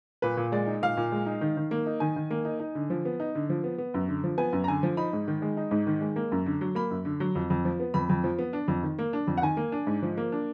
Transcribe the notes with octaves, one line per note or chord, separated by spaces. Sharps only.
A#2 B4
A#2
G#3 D5
D#4
A#2 F5
A#2
G#3
D#4
D#3
D#3
A#3
D#4
D#3 G#5
D#3
A#3
D#4
D#4
D3
F3
B3
D#4
D3
F3
B3
B3
F#2
D3
F3
B3 G#5
F#2
A#5
D3 G#5
F3
D#4 B5
G#2
D#3
G#3
D#4
G#2
D#3
G#3
A#3
F#2
D3
F#3
A#3 B5
F#2
D3
F#3
F2
F2
F3
B3
F2 B5
F2
F3
B3
D4
F2
D#3
A#3
D4
F2
F#5
D#3 G#5
A#3
D4
G#2
F3
A#3
D4